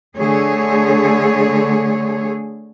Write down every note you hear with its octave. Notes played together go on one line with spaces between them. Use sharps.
D3 A3 G#4 C#5